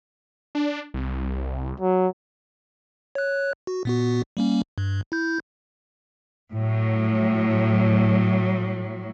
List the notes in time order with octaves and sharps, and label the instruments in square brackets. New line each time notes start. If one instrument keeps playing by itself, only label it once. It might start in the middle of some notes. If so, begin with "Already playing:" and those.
[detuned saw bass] D4
C2
[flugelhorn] F#3
[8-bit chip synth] C#5 F#6
F#4
A#2 B3 F#4
G3 A#3 C#4
G2
E4 G6
[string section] A2 F#3